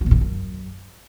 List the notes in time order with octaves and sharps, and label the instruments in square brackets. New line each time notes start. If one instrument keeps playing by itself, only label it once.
[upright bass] F#3
B2
G2
D3
F#2